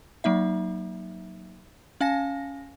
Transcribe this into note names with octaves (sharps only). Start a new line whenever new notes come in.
F#3 A#3 D#4 E5
C#4 F5 G#5 A#6